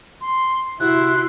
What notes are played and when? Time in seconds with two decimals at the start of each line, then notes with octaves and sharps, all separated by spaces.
0.21 C6
0.80 C3 E4 F#4 C6 F#6